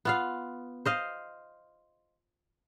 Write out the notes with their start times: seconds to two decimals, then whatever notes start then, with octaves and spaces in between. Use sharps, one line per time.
0.05 B3 F4 F5
0.85 C5 D#5 F5